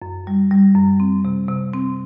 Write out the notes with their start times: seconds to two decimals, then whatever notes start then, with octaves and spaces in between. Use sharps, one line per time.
0.02 F#2
0.27 G3
0.51 G3
0.76 F#2
1.00 C4
1.25 C3
1.49 C3
1.73 C4